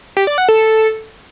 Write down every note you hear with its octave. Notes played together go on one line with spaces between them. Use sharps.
G4
D5
F#5
A4